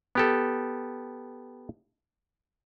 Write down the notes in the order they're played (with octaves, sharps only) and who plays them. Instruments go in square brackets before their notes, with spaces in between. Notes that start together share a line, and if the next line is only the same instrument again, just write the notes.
[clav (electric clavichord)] B3 G4 A4